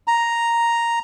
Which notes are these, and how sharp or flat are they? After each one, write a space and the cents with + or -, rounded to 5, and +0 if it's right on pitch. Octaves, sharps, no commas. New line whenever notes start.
A#5 +0